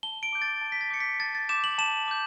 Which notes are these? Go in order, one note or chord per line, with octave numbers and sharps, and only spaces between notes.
A5 G7
D7
D6 G6
A6
A5
B6
A6
D6 G6 C#7
B6
A5 A6
A6
D6 G6 E7
F#7
A5 E7
D6 G6